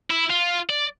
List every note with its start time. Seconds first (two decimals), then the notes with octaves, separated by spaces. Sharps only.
0.10 E4
0.30 F4
0.69 D5